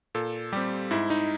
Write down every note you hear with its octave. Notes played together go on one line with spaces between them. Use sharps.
A#2 A4
G3 C4 G4
G#2 E4
D#4